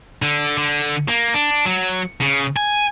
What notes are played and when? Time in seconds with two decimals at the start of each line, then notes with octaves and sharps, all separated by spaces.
0.22 D3
0.58 D3
1.08 A#3
1.34 D4
1.65 F#3
2.21 C#3
2.57 G#5